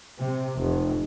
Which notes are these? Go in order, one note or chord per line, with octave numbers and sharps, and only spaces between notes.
C3
F1